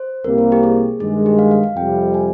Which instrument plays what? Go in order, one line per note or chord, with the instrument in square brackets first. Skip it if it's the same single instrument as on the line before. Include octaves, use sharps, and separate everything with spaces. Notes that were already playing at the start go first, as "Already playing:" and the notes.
Already playing: [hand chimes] C5
[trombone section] C2 C3 G3 A#3 [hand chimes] A#4
[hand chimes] C5
G4
G#4
[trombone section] G2 D#3 G#3 [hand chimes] G#4
[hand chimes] G4
F5
F5
F5
[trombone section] F2 C3 G3 [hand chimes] G5
[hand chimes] G#5